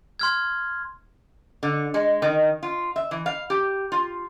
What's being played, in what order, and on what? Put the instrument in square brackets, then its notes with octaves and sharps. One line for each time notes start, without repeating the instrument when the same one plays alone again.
[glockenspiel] C6 F6 G#6
[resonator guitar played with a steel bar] D3
G#3
D#3
F4
E5
E3
F5
G4
F4